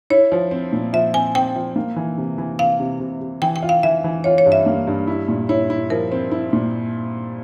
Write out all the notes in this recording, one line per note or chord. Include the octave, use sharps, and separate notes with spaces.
E4 C#5
F3
C4
A#2
F3 E5
C4 G#5
C4 G5
F3
A#3
E3
C3
E3
C3 F5
C3
C3
C3
E3 G5
G5
F4
F5
E3 E5
E3
F4 C#5
C#5
G2
E5
A#3
G2
E4
A#2
E4 C#5
E4
F3 A#4
C4
E4
A#2